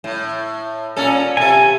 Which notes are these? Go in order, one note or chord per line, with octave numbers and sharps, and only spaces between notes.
A2
A#2 C#4 A4
C3 A4 G#5